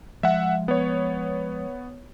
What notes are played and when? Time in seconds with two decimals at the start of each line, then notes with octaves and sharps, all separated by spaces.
0.23 F3 G#3 E5 F#5
0.68 B3 C#5